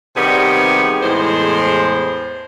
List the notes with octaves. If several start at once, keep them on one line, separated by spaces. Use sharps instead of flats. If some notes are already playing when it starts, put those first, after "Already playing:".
C3 D#3 G3 B3 G4 G#4
E2 A2 G#3 C5